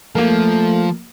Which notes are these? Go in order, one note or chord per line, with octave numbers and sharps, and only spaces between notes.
F3 A3 A#3 A#4